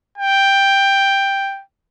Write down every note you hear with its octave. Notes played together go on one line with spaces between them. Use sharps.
G5